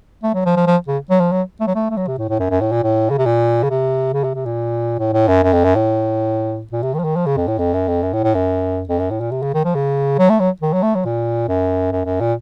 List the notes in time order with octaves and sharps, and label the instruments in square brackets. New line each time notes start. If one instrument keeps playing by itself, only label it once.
[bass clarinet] A3
F#3
F3
F3
F3
C#3
F#3
F3
F#3
A3
F#3
A3
A3
F#3
C3
A2
A2
F#2
F#2
A2
A#2
A2
C#3
C3
A#2
C#3
C3
C#3
C3
C3
A#2
A2
A2
F#2
F#2
F2
F#2
A2
A#2
C3
D#3
F3
D#3
F3
C#3
F2
A2
F2
F#2
F2
F#2
A2
A2
F#2
F2
F#2
A2
A#2
C3
C#3
D#3
F3
C#3
F#3
A3
F#3
D#3
F#3
A3
F#3
A#2
F#2
F#2
F#2
A#2